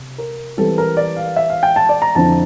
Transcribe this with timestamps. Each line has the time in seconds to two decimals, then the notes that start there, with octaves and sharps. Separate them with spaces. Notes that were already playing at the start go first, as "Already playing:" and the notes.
Already playing: C3
0.18 A#4
0.57 E3 G3 C4 E4 A4
0.78 A#4
0.97 D5
1.16 F5
1.36 E5
1.50 F5
1.63 G5
1.76 A5
1.89 D5
2.02 A#5
2.15 F2 D3 F3 C4 E4 A5